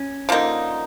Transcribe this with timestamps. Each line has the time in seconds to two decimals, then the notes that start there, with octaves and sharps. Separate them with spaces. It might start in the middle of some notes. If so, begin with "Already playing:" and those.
Already playing: C#4
0.29 D3 F3 A#3 D#4